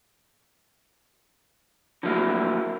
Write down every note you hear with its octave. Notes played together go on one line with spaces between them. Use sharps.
D3 F3 F#3 A3 A#3 E4